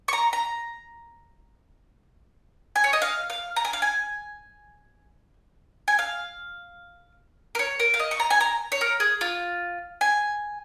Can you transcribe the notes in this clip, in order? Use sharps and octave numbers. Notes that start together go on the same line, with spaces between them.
C#6
A#5
A#5
G#5
C#5
D#5
F5
F5
A#5
G#5
F5
G#5
G#5
F5
A#4
C#5
A#4
F5
D#5
C#6
A#5
G#5
A#5
C#5
A#4
G#4
F4
G#5